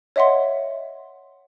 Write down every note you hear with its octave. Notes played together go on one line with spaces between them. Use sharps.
C#5 D#5 E5 F#5 C6